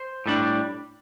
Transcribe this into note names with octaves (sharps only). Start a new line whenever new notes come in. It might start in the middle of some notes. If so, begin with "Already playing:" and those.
Already playing: C5
A2 G3 D4